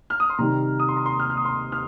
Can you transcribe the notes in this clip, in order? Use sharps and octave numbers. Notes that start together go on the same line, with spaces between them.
F6
D#6
C6
C3 D#3 G3 A#5
D#6
C6
A#5
C6
F6
F6
D#6
C6
F6